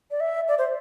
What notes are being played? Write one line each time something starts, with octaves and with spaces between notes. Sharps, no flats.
D5
E5
D5
C5